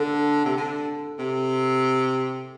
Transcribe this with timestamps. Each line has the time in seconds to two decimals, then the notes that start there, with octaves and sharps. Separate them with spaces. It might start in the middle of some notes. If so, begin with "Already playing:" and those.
Already playing: D3 A4
0.45 C3
0.57 D3
1.18 C3